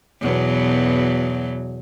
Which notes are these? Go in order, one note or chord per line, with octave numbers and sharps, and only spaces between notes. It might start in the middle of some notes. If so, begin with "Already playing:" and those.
E2 B2 F#3